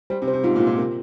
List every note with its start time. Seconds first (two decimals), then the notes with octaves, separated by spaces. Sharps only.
0.10 G3 C5
0.22 C3
0.28 C5
0.33 C3
0.43 G#2 F4
0.56 A#2
0.60 F4
0.67 A#2
0.78 C3 A#4